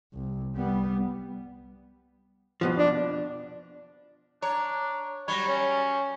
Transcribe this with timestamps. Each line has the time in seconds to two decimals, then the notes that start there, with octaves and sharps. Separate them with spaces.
0.14 C2
0.55 G3 B3
2.61 F2 B2 F3
2.78 D4
4.42 D4 C#5 A#5
5.28 F#3 G3 C#5 B5 A#6
5.48 C#4 C#5